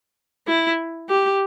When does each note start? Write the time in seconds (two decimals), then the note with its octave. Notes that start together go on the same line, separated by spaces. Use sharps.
0.48 E4
1.09 G4